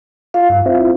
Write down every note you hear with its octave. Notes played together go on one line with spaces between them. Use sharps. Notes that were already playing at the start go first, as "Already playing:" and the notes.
F4 F5
G2
C4 E4 F4